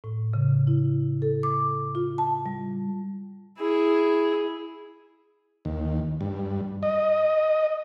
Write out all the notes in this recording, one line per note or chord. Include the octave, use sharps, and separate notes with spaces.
A2
C#3
E4
A4
D6
F4
A5
G3
E4 G#4
D#2
G2
D#5